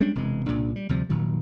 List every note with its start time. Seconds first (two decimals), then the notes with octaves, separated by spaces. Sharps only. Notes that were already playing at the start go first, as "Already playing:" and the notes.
0.01 G3 G#3 C#4 D4
0.15 E1 C3 E3 G#3
0.46 C2 A#2 C#3 D4
0.76 G3
0.89 D2 C3 F3 G3
1.09 F1 A#2 D#3 F#3